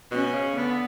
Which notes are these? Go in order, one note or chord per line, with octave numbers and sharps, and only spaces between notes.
B2 C#4
C#3
D3 B3